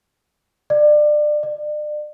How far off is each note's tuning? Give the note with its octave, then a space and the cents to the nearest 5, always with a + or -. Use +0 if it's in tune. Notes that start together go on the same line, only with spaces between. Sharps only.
D5 +25
D5 +35